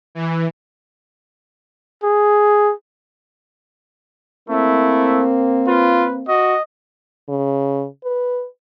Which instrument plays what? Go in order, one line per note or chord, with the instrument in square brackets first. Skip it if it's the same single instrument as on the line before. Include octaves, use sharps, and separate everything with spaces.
[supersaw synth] E3
[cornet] G#4
[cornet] A3 [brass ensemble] A#3 C4 [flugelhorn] E4
[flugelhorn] F4 [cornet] B4
[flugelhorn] F#4 [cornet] D#5
[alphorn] C#3
B4